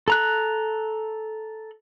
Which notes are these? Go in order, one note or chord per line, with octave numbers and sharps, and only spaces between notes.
A4 A#5 F#6